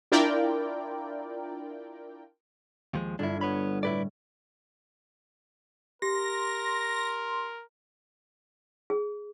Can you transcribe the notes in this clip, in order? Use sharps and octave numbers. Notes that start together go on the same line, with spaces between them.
D4 E4 F4 A#4 D5 G5
D#2 F3 G#3
G1 D4 E4
B3 C#5 B5
A2 E4 B4 D5
G4 A#4 C6 A#6
G#4